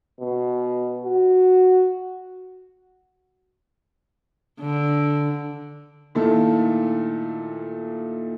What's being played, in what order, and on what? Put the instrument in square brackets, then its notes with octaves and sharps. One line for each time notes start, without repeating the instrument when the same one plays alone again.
[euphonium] B2
F#4
[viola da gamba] D3
[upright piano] A#2 D#3 A3 E4 F4 A4